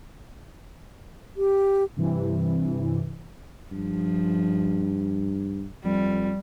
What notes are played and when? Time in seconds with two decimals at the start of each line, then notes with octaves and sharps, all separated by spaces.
1.37 G4
1.96 G2 C3 E3
3.72 G2 F3
5.85 F2 G3